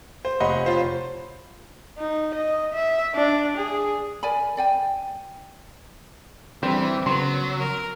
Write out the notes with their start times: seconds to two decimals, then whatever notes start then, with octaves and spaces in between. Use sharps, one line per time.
0.25 C5
0.40 F1 C#5 D#5 F#5 B5 C6
0.66 F4 C5
1.98 D#4
2.35 D#5
2.73 E5
3.15 D4
3.57 G#4
4.23 A#4 D5 G#5 B5
4.57 D5 G5 G#5
6.63 E3 G3 C4 D4
7.06 C#3 F#3 B3 C6
7.59 A#4